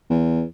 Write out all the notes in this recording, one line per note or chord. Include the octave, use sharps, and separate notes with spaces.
E2